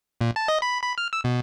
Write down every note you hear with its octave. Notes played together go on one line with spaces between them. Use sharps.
A#2
A5
D#5
B5
B5
F6
E6
B2